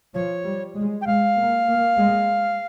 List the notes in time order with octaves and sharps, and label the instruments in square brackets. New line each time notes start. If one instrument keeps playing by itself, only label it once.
[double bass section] F3 [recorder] C#5
[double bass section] G3
G#3
[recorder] G5
[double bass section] G#3 [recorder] F5
[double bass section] A#3
A#3
G#3